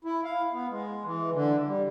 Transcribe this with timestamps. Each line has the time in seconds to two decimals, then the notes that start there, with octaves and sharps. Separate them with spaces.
0.05 E4
0.24 F5
0.53 B3
0.70 G#3
1.06 E3
1.33 D3
1.67 G3